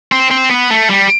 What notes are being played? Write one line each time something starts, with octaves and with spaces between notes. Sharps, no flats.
C4
C4
B3
A3
G3